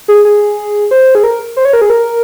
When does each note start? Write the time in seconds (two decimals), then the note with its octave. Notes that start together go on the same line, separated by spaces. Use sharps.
0.08 G#4
0.25 G#4
0.91 C5
1.15 G#4
1.24 A#4
1.57 C5
1.65 C#5
1.73 A#4
1.81 G#4
1.90 A#4